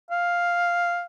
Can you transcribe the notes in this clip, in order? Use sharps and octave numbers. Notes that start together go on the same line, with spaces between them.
F5